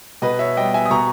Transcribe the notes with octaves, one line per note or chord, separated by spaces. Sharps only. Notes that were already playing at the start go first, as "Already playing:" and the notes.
B2 B4 D#5
C#5 E5
G3 B3 D#5 G5
E5 G#5
D#6
B2 A#5 C#6